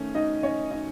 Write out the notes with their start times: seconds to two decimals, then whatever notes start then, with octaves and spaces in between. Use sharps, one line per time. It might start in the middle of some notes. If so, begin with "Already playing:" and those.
Already playing: D#3 A3 C#4
0.15 D#4 D#5
0.43 C#4 C#5
0.71 D#4 D#5